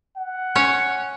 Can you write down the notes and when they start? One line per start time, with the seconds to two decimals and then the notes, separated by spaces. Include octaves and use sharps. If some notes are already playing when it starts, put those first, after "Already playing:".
0.16 F#5
0.56 C#4 C#5